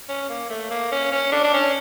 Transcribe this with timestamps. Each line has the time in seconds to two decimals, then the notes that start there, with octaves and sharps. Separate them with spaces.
0.09 C#4
0.29 A#3
0.50 A3
0.71 A#3
0.92 C#4
1.12 C#4
1.32 D4
1.43 D4
1.54 C#4